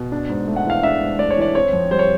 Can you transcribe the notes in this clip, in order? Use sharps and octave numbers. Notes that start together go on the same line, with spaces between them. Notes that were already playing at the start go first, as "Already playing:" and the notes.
Already playing: B2
D4
G#2
A3
F#5
E3 F5
D4 E5
G#2
A3 D5
C#5
E3 D5
C4 C#5
F2
G3 C5
C#5